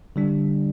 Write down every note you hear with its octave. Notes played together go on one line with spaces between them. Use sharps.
D3 G3 D4